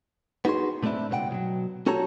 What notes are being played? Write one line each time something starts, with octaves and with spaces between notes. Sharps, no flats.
B3 D#4 F#4 G#4 C6
A#2 A3 C4 D4 E4
C#2 G2 B2 B4 F#5 G5
B2 F3 F#3
C#4 F#4 G4 A4 C#5 A#5